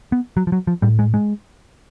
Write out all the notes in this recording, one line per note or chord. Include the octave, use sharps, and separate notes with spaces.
B3
F#3
F3
F#3
F3
A2 G3
G#3
G#3